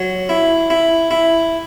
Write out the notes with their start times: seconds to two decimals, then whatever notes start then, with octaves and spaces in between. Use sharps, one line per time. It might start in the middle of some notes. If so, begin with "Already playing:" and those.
Already playing: F#3
0.29 E4
0.70 E4
1.11 E4